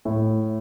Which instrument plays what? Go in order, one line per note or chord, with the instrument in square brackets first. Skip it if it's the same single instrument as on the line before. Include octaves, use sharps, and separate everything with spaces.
[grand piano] A2